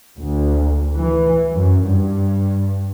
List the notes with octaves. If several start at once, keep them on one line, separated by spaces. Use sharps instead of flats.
D2
E3
F#2
G2